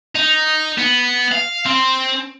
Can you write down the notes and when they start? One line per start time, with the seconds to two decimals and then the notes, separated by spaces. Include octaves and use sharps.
0.15 D#4
0.78 B3
1.32 F5
1.66 C4